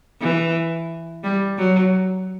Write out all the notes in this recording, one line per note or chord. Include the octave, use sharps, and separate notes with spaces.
E3
G3
F#3